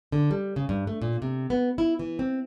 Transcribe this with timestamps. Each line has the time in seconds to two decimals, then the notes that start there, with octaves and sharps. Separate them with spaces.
0.12 D3
0.31 G3
0.56 C#3
0.69 G2
0.87 A3
1.02 A#2
1.22 C3
1.50 B3
1.78 E4
1.99 E3
2.19 C4